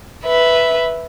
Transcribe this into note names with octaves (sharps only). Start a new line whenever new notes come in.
B4 E5